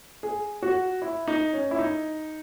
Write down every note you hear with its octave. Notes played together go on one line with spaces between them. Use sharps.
G#4
F#4
E4
D#4
C#4
E4
D#4